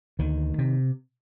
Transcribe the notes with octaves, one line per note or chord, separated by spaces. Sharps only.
D2 D#3
C3